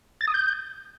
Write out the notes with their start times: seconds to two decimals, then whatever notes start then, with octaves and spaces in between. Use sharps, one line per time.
0.21 A6
0.27 D#6
0.34 G6